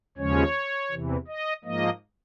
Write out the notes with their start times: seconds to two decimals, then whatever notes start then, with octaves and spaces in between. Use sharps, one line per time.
0.18 D#2 C#3 F3 G#3 C#4 C#5
0.91 E2 C3 E3
1.28 D#5
1.64 G#2 F3 A#3 D#5